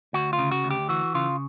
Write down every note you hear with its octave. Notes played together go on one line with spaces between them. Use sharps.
D2 F#4
F4
C#3
F#4
D2
G4
E3 F#4
C#3 F4